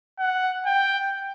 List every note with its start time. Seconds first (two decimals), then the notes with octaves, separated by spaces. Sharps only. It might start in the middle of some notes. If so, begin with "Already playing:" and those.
0.19 F#5
0.66 G5